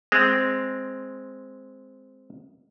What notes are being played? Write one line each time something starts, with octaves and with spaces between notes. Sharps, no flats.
G#3 C4